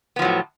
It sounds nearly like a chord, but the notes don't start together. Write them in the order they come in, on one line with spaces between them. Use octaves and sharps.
B3 F3 F#3 A2